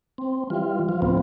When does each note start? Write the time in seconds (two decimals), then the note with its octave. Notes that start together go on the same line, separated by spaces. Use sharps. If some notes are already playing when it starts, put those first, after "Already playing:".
0.18 C4
0.50 E3 G3 F4
0.89 F3 F4
1.02 D2 A2 F3 B3 C4